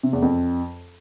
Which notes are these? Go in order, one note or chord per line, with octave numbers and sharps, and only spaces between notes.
C3
E2
F2